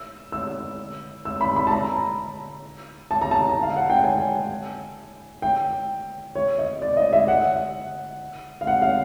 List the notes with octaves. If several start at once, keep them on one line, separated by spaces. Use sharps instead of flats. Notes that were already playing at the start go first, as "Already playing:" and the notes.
Already playing: E6
E6
E6
B5
B5
A5
A#5
A5
A#5
A5
F5
F#5
G5
G#5
G5
C#5
D#5
D5
D#5
E5
F#5
F5
F#5
F5